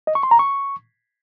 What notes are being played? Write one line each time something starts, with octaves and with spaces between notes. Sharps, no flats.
D#5
C#6
C6
A#5
C#6